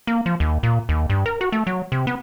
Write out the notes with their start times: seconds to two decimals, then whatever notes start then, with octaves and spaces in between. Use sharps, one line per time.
0.07 A#3
0.26 F3
0.40 D#2
0.63 A#2
0.89 D#2
1.10 G2
1.26 A#4
1.41 F#4
1.52 A3
1.67 F#3
1.92 C3
2.07 B3